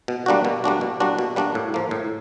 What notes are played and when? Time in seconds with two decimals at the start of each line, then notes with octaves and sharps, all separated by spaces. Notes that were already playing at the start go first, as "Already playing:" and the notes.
0.08 B2
0.26 G3 A#3 D4 F#4
0.45 B2
0.64 G3 A#3 D4 F#4
0.81 B2
1.00 G3 A#3 D4 F#4
1.19 B2
1.36 G3 A#3 D4 F#4
1.55 A2
1.74 F3 A#3
1.91 A2